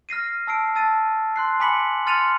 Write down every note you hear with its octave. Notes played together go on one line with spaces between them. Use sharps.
F6 A#6 C7 D#7
A5 E6 C7 D7
A5 E6 A6 D#7
C6 F#6 C7
G#5 B5 D6 B6 C#7 F#7
C6 F6 A6 C#7 D#7 F7